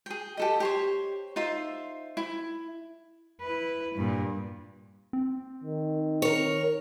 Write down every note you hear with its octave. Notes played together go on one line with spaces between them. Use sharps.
G#4 G5
G4 A4 D#5
G4 C5 C#5
D#4 F4 C5 E5
E4
E4 B4
G2 A#2
C4
D#3
A#4 C#5